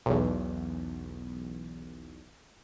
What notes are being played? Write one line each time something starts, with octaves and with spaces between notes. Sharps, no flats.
B1 E2